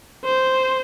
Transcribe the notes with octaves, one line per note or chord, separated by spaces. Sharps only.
C5